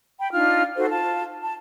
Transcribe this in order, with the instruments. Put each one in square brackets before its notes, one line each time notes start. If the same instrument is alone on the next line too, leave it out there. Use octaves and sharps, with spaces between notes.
[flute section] G5 B5
D4 D#4 F4 F6
D#4 F#4 A4 C5
F4 A5
A5